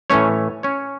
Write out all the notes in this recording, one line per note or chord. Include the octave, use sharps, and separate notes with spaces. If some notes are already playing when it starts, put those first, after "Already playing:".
A2 E3 A3 C#4 C#5
C#4 C#5